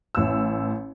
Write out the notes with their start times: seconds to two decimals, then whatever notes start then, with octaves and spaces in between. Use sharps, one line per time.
0.15 A1 E6